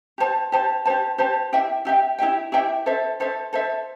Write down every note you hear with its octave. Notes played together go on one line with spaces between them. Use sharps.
G4 C5 A5
G4 C5 A5
G4 C5 A5
G4 C5 A5
E4 G4 E5 G5
E4 G4 E5 G5
E4 G4 E5 G5
E4 G4 E5 G5
A4 C5 E5
A4 C5 E5
A4 C5 E5